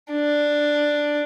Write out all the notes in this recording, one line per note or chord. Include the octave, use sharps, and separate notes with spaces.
D4